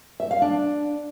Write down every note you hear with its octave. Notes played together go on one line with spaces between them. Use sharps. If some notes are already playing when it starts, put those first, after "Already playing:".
E5
F5
D4